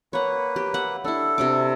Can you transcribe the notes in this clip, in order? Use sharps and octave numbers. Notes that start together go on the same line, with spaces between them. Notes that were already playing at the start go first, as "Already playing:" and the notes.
A#3 B4 C#5 F#5
G4
E5 F#5
D4 E4 A4
C3 D4 D6